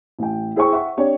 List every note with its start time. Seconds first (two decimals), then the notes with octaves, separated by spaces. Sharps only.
0.19 A1 G5
0.56 E4 G#4 C5 G5 C#6
0.73 E5 F#5 C#6
0.97 C4 D4 G4 C#5